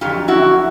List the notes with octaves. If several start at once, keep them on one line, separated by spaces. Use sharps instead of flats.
F2 D3 F#3 F4 G4
E4 F#4